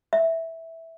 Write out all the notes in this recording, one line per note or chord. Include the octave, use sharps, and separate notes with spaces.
E5